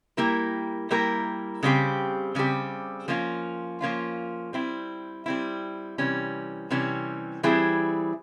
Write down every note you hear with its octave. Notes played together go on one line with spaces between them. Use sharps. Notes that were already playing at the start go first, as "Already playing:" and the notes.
G3 A#3 E4 G4 A#4
G3 A#3 E4 G4 A#4
C#3 G3 C4 G4
C#3 G3 C4 G4
F3 A#3 C#4 F4
F3 A#3 C#4 F4
G3 C4 E4
G3 C4 E4
C3 E3 G3 C#4
C3 E3 G3 C#4
E3 G3 C4 E4 G#4